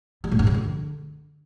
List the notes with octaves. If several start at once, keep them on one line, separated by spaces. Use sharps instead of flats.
G3
A2
G2
C#3
D3